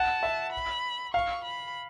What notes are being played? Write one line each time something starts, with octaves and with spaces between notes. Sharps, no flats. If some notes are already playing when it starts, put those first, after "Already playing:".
Already playing: F#5 A5
E5
B5
F5 C#6
B5